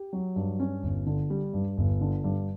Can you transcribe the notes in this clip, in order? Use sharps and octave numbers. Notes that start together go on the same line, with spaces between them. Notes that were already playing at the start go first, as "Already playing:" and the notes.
Already playing: G4
F#3
G2
C#4
G1
D3
G3
G2
G1
D3
G2